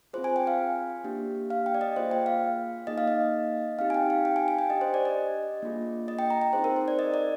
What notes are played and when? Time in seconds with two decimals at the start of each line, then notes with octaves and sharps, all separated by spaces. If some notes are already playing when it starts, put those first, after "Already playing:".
0.13 C4 F4 G#4 C5
0.24 G#5
0.36 G5
0.47 F5
1.04 A#3 D4 G4
1.50 F5
1.66 G5
1.74 D5
1.81 D#5
1.96 A#3 F4 G#4 C5
2.11 G5
2.26 F5
2.87 A#3 D#4 G#4 D#5
2.98 F5
3.07 D#5
3.79 C4 D#4 G4 F5
3.90 G#5
3.94 G5
4.10 F5
4.25 G5
4.36 G#5
4.48 G#5
4.59 G5
4.70 D4 G4 D#5
4.81 C5
4.94 D5
5.05 D#5
5.62 A#3 D4 F4 G#4
6.08 D#5
6.19 G5
6.30 A#5
6.42 G5
6.53 C4 D#4 G#4 C5
6.64 A#4
6.76 C5
6.88 D5
6.99 D#5
7.14 D5